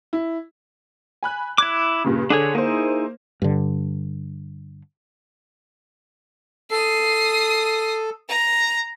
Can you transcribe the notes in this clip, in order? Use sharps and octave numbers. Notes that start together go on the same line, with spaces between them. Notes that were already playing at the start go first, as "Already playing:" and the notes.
E4
G#5 B5 F#6
E4 D6 F#6 G#6
G2 A#2 C#3
D3 D4 G#4 C#5
A#3 D#4 E4 G#4 C5
G2 D3
A4 D#6 C7
A#5